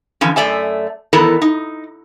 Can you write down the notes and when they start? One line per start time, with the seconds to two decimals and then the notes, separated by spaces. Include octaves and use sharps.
0.21 D3 E3 F3 C#4
0.36 F#2 A3 D5 E5 G#5
1.13 D#3 E3 B3 E4 A4 A#4
1.42 D#4